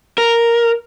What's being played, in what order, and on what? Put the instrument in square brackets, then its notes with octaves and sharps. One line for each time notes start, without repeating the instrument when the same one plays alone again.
[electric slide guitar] A#4